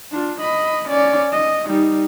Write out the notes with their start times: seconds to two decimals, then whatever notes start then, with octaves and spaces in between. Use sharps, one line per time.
0.12 D4 F4
0.41 D#5 B5
0.89 C#4 D5
1.32 D#5
1.67 G3 D#4